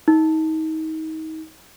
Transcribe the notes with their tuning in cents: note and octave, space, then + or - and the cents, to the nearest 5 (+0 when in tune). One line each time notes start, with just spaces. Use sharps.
D#4 +30